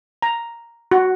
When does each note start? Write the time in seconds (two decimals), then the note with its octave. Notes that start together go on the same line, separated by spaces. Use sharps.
0.22 A#5
0.91 F#4